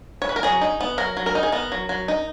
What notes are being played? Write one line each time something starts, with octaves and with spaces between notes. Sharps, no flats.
C#5
B4
A#4
F#3 G#4
D#4
B3
F#3 A#4
F#3
A#4
D#4
G#4
B3 A#4
F#3
F#3
D#4